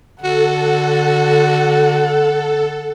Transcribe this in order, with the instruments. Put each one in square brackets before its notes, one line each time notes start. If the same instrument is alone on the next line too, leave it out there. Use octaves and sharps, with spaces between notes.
[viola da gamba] D3 [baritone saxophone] F#4 [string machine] A4 [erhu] F#5